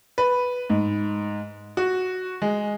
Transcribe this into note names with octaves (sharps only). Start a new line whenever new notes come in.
B4
G#2
F#4
G#3